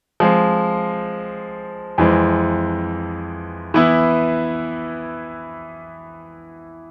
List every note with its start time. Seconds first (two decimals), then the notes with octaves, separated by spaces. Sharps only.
0.20 F3 G#3 C4
1.98 F2 E3 G#3 C4
3.74 E3 B3 E4